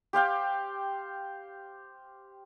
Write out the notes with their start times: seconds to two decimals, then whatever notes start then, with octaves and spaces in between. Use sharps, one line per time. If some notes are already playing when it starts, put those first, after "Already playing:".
0.13 G4 C5 F5 G5